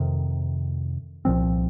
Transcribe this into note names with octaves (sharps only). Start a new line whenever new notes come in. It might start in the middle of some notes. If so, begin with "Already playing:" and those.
Already playing: F2 C3 D#3
C2 A#2 F3 C4